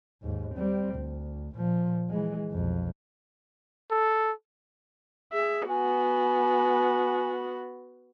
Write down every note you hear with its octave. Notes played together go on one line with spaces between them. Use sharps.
D#2 G#2
G3 C4
D2
A#2 F3
E3 G#3
B1 F2
A4
G#4 E5
B3 F#4 G#5